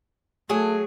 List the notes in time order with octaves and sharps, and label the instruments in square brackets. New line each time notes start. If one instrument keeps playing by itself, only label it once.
[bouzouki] F#3 G#4 [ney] A3